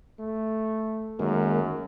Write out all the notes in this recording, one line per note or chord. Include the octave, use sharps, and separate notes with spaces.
A3
F#2 D#3 G#3 A#3